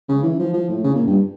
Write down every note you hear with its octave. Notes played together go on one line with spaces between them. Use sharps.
C#3
E3
F3
F3
A2
C#3
A#2
G2